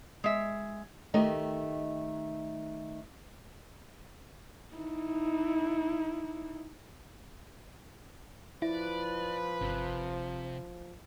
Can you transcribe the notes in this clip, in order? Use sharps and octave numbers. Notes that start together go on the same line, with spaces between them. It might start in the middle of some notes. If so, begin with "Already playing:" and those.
G#3 E5
D#3 A3 D#4 G4 D#5
D#4 E4
F3 E4 B4 D5
G1 C3